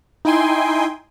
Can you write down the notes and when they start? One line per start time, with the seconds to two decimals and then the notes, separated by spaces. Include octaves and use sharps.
0.25 D#4 E4 G5 G#5 C6